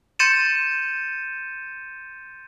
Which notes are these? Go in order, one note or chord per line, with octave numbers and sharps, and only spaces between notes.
C6 G6 A6 C#7 D#7 E7